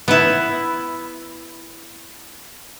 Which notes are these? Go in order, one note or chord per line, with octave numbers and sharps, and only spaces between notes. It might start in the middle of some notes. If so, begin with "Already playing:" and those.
B3 E4